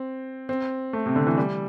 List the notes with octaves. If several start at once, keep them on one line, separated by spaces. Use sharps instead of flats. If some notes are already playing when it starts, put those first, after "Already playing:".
Already playing: C4
C4
A3
C3
D3
E3
G3